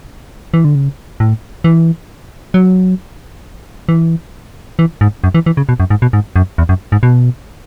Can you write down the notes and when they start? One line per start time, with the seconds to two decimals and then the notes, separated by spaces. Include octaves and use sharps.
0.54 E3
0.65 D3
0.75 C#3
1.20 A2
1.64 E3
2.54 F#3
3.89 E3
4.79 E3
5.01 G#2
5.24 F#2
5.35 E3
5.46 E3
5.57 C#3
5.69 B2
5.80 F#2
5.90 G#2
6.02 B2
6.13 G#2
6.36 F#2
6.58 E2
6.69 F#2
6.92 G#2
7.03 B2